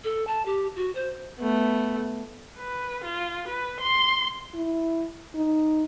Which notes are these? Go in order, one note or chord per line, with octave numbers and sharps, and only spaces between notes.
A4
A5
G4
F#4
C5
A3 B3
B4
F4
B4
C6
E4
D#4